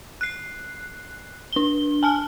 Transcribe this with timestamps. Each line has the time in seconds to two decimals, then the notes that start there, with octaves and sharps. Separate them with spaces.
0.21 F#6 C7
1.53 D4 G7
2.03 G#5 A5 F6